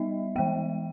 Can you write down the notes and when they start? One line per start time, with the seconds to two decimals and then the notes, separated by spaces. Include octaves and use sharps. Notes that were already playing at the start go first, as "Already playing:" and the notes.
Already playing: G3 B3 D#4 D#5 E5
0.36 E3 G#3 B3 G5